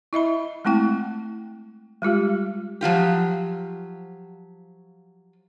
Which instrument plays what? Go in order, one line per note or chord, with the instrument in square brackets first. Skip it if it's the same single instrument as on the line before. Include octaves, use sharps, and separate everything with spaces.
[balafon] E4 D#5 E5 B5
G#3 A3 C4 E4 G5
G3 G#3 F4 G4
[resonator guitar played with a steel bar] F3 F#3 F4 G4